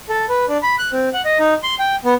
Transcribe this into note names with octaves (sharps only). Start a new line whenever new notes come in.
A4
B4
D4
B5
F#6
C4
F#5
D#5
D#4
C6
G5
B3